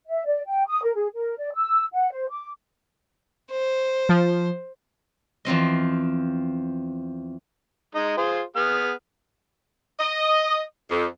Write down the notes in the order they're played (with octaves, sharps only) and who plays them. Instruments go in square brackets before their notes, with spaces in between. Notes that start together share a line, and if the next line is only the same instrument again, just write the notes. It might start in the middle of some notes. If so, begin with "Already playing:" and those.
[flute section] E5
D5
G5
D#6
A#4
G#4
A#4
D5
E6
F#5
C5
D6
[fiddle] C5
[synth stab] F3
[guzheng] E2 F3 C4 D#5
[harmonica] G#3 D#4 D#5
F4 G#4 C5
B3 G#4 F6
[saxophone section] D#5
F2